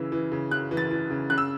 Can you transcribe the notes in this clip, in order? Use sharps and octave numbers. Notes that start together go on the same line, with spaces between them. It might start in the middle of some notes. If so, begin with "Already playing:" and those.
Already playing: C#3 E3 E6
E3
C#3
C#3 F#6
E3
A6
E3
C#3
C#3 F#6
E6